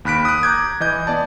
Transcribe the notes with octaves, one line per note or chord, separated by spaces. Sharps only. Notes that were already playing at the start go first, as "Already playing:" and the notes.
D#2 B5 F#6 B6 D7
D#6 F#6
A#5 D6 G6 G#6
E3 D#5 G6
B3 D5 A5